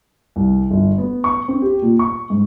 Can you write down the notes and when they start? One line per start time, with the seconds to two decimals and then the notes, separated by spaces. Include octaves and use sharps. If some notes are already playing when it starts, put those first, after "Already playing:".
0.36 C2
0.71 G1
0.98 B3
1.24 C#6
1.48 C4
1.62 G4
1.82 A#2
1.99 C#6
2.30 G#2